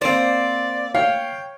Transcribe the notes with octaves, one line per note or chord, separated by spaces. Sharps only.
A#3 C4 C5 D5 D6 D#6
C#5 F5 G5